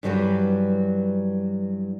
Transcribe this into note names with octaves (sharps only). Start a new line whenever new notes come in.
G2 E3 F#3 G3 F#4 B4